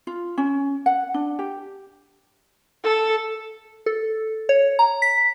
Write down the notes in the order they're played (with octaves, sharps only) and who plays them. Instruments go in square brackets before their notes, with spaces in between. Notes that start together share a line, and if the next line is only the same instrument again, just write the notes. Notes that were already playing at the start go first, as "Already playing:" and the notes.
[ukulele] F4
C#4
F#5
D4
G4
[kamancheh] A4
[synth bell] A4
C#5
A#5
B6